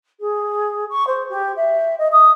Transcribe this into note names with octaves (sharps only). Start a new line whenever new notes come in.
G#4
C#6
C5
G4
E5
D#5
D#6